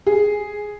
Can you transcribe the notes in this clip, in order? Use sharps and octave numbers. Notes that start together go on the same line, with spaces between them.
G#4